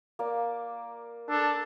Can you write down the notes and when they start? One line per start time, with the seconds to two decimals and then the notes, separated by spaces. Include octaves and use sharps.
0.19 A#3 D5
1.29 D4 A4